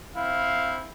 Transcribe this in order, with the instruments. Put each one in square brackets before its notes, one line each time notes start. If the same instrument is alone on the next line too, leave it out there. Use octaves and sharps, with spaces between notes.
[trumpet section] C4 E4 [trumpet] F5